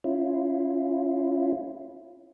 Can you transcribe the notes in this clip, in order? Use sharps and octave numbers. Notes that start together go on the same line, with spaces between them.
C#4 E4 F4